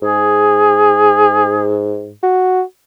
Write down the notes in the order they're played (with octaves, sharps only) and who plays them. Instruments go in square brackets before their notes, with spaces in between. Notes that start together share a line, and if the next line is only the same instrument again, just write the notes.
[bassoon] G#2 [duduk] G#4
[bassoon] F#4